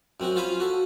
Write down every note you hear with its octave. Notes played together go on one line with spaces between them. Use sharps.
F#2 C4 C#4 F#4
C#4 F4 C5 F5 G#5 B5
F#4 A4